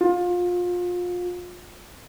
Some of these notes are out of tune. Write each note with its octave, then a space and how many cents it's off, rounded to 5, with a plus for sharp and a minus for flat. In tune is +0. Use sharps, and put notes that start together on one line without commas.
F4 +25